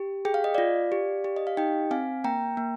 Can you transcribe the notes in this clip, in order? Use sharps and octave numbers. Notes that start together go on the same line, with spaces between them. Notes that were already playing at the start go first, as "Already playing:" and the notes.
Already playing: G4
G#4 G5
F5
D#5
F4 D5 F5
G4
G4
D#5
F5
D#4 D#5 G5
C4 F5 G#5
A#3 G5 A#5
A#3